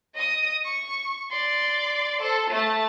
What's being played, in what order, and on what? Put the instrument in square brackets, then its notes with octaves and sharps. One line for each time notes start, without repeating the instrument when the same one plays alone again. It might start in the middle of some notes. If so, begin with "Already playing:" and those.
[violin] D#5 D#6
C#6
D5 C6
A4 C5
A3 A5